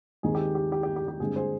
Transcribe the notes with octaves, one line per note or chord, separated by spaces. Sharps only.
D#2 D#3 G#3 C4 G#4
G4
G4
G4
G4
G4
G4
G2 D3 G#3 C4 G#4
G#4 C5